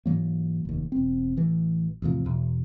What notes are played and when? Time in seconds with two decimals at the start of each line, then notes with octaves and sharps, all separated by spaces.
0.06 G#2 E3 F#3 A#3
0.65 F1 D#2
0.92 E1 C4
1.37 A1 E3
2.02 A1 E2 C3 F3
2.25 E2 B2